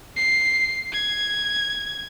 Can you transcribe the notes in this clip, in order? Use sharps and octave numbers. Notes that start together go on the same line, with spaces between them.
C7
G#6